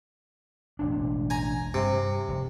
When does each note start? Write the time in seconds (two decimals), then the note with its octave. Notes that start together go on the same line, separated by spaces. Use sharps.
0.79 E1 A1 D4
1.30 G#5 A#5
1.74 G2 C3
2.28 F1